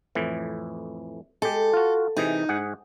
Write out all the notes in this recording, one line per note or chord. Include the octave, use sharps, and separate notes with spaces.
F2 A2 E3
G#3 G4 A4
F4 F#4
C3 E3 D#4 G#4
G#2 G#4 F#5